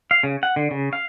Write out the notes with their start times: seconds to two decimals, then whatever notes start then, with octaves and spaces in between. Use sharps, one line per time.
0.11 F5
0.23 C#3
0.43 F#5
0.56 D3
0.71 C#3
0.93 F5